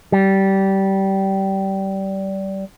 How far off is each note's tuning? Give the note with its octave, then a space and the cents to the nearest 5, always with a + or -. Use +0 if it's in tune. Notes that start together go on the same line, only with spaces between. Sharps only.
G3 -20